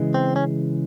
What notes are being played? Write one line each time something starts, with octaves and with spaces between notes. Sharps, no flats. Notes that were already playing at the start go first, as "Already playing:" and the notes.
Already playing: C#3 E3 G#3
C4
C#4